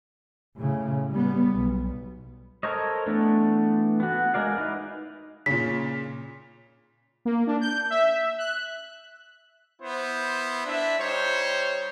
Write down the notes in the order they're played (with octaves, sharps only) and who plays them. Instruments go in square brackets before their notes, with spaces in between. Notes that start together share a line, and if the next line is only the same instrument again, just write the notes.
[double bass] A2 C#3
G3 B3
B1
[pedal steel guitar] A4 A#4 C5 C#5 D#5
E3 A3 B3 D4
B3 F#4
G#3 A#4 D5 F5
D#4 E4 B4
[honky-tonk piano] A#2 C#3 [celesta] B6
[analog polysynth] A#3
D4
G6
E5
F#6
[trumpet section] B3 E4 C5
D4 E4 E5
G3 D#4 C5 C#5